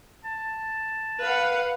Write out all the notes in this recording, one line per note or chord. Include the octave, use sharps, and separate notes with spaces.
A5
B4 F5 F#5